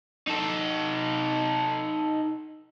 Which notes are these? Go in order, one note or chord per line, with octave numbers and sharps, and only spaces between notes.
D#4 A4